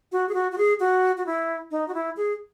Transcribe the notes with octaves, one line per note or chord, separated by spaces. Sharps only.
F#4
G#4
F#4
F#4
G#4
F#4
F#4
E4
D#4
F#4
E4
G#4